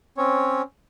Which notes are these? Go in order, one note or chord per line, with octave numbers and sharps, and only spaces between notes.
C4 C#4 C#5